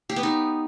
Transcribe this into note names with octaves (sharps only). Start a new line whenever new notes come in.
G4
B3
D#4